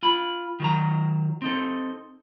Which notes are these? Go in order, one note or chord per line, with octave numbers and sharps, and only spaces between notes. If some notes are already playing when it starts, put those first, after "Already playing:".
F4 B5
D#3 F#3 A#5
C4 D#4 A4